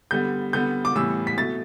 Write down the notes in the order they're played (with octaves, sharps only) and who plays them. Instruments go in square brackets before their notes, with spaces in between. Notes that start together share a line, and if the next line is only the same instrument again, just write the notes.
[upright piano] D3 G3 B3 G6
D3 G3 B3 G6
D6
A2 E3 G3 B3 E6
B6
B2 A3 A6